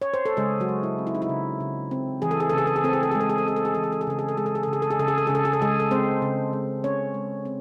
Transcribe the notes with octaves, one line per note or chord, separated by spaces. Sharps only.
C#5
C5
A4
C#3 G#3 G#4
F#3 F#4
G#3
E4
C4
E4
D#4
E4
C#3
C#3
C4
E3 G#4
A4
G#4
C#3 A4
G#4
A4
G#4
C4 A4
G#4
A4
G#3 G#4
A4
G#4
A4
C4 G#4
A4
G#4
E3 A4
G#4
A4
G#4
C#3 A4
G#4
A4
G#3 G#4
A4
G#4
A4
C#3
G#4
A4
G#4
C#3 A4
G#4
A4
C#3 G#4
A4
G#4
A4
C#3 G#3 G#4
A4
G#3 C4 C5
C#3
G#3
C4 C#4 C#5
G#3
C4